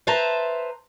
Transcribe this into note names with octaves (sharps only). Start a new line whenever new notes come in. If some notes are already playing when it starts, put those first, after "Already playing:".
B4 C5 E5 A5 A#5